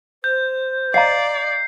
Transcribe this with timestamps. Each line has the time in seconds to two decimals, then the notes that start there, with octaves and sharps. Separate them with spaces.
0.24 C5 G6
0.94 D5 D#5 F5 A#5 C7